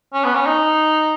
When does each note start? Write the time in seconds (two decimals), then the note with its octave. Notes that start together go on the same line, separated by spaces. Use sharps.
0.14 C#4
0.25 B3
0.35 C#4
0.47 D#4